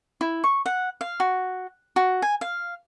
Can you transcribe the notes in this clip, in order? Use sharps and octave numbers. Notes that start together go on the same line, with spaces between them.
E4
C#6
F#5
F5
F#4
F#4
G#5
F5